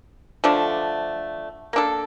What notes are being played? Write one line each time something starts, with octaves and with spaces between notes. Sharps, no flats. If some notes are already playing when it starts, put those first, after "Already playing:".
D3 F3 A3 D4
A#3 D4 A4